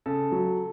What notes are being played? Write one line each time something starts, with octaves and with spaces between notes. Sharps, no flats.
C#3 A4
F#3